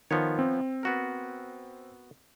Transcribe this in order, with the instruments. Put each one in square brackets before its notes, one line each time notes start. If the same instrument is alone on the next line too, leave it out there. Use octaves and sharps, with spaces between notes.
[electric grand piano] D#3 [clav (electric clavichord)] F3 B3 C#5
[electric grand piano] C4
[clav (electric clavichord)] B3 F#4 A#4